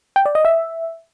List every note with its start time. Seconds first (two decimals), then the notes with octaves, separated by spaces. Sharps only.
0.16 G5
0.26 D5
0.35 D#5
0.45 E5